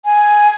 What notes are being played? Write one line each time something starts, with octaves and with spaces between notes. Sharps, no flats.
G#5